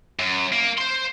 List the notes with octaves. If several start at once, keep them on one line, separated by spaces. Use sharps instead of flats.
F#2
A#3
C5 C6